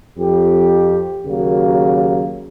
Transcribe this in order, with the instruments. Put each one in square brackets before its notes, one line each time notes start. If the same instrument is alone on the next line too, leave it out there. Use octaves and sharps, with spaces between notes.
[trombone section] F2 G4
D#2 C#3 F#3 A#3